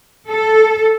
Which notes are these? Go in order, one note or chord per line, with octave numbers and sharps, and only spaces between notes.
A4